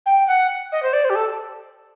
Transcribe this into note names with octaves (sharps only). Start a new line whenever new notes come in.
G5
F#5
D#5
C5
D5
C5
G4
A4